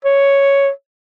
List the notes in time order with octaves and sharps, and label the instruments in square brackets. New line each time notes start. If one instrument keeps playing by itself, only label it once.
[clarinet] C#5